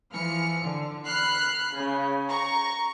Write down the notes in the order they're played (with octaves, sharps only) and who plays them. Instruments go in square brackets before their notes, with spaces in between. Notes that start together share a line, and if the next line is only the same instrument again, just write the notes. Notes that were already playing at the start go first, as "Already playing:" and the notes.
[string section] E3 F3 F6 C#7
D3
B5 F6 F#6 C7
C#3
A#5 C#6